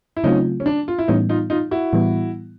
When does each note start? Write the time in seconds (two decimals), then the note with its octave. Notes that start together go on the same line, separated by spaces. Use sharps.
0.17 E4
0.24 C#3 F#3 A3 C4 C#4 D#4 F4
0.60 C#4
0.66 D4
0.88 F4
0.99 E4
1.08 A2 E3 G3 B3 C#4 D#4
1.29 D#4 F4
1.50 D#4 F4
1.71 E4 F#4
1.93 A2 E3 G3 B3